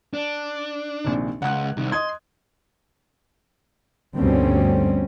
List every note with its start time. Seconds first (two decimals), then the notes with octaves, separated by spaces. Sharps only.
0.14 D4
1.04 A#1 C3 D#3
1.42 C#2 F#5 F#6
1.77 C2 D#3
1.92 D#5 C6 D#6 G#6
4.18 D2 G2 B2 G3 C4 C#4